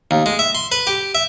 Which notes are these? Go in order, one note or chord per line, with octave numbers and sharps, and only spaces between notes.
D#2
G#3
E5
C6
B4
G4
E5